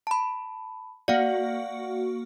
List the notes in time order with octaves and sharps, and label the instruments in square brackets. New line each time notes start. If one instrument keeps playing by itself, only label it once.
[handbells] A5 B5
[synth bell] A#3 F#4 [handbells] D5 F5 F#5